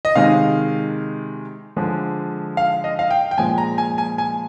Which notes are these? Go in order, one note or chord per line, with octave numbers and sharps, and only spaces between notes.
D#5
C3 D#3 G#3 F5
D3 F3 G#3
F5
D#5
F5
G5
G5
A#2 F3 G#3 G#5
A#5
G#5
G#5
G#5